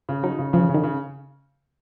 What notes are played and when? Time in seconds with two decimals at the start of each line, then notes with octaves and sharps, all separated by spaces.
0.09 C#3
0.23 F#3 D#4
0.39 C#3
0.53 C#3 F3
0.69 C#3
0.74 D#3
0.83 C#3